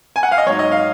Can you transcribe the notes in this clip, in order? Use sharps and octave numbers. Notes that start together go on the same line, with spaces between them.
G#5
F#5
F5
D#5
G#2 F#3 C#5
D#5
F5